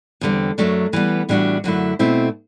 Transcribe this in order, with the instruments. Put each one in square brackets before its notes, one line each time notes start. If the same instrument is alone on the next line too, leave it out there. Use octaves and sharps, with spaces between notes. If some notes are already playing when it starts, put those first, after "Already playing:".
[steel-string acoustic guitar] E2 D3 G3 C4
F#2 F#3 A3 D4
E3 G3 B3
A2 E3 G3 D4 F#4
F#2 D3 F#3 A3 E4
B2 A3 C4 E4